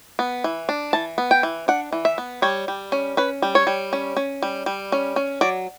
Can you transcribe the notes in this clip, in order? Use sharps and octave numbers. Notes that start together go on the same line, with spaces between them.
B3
E3
D4
E3 A5
B3
G5
E3
D4 F#5
E3
E5
B3
G3 C#5
G3
C#4
C#4 B4
G3
C#5
G3
C#4
C#4
G3
G3
C#4
C#4
F#3 D5